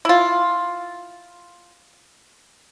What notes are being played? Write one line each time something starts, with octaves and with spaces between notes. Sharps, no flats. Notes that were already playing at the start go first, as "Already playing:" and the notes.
E4 F4